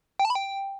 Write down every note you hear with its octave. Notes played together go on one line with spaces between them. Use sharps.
G5
A5
B5
G5